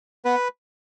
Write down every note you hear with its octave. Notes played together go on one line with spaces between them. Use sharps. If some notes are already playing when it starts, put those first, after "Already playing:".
B3 B4